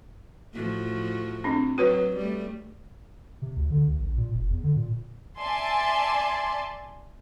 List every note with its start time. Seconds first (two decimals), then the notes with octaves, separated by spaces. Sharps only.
0.54 A2 F3 F#4
1.44 C4 D4
1.78 F#3 F#4 B4 C#5
2.16 G3 A3
3.42 C3
3.56 D2
3.71 D3
3.87 D2
4.00 A#1
4.17 A#2
4.34 F1
4.50 E2
4.63 D3
4.76 A#2
5.38 D5 E5 G#5 A5 C6